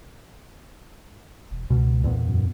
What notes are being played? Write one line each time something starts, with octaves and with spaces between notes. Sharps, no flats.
E1
C#2 B2
E2 A#2 B3
F#2